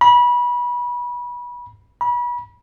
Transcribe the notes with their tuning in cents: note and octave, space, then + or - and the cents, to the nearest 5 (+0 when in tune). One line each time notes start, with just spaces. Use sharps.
B5 -25
B5 -30